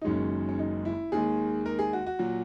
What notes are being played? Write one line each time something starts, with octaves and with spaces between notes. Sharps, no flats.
D#4
F#1 F#2 D#3 G#3 C#4
C#4
D#4
E4
D#2 D#3 G#3 G#4
A#4
G#4
F#4
F#4
A#2 F#3